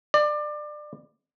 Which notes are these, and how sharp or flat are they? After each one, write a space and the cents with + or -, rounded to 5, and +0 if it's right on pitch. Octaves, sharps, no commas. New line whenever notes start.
D5 +25